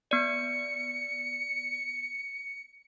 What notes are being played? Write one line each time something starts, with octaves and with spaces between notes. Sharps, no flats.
B3 D5 C#7